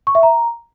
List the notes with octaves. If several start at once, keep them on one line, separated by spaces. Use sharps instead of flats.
C#6
E5
A#5